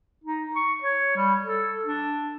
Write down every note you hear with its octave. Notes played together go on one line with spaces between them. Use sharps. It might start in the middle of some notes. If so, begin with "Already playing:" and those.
D#4
C#6
C#5
G3
A4
D4